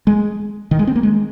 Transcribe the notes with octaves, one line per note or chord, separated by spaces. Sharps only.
G#3
D#3
G#3
C4
A#3
G#3